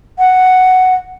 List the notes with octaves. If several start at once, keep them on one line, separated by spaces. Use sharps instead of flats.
F#5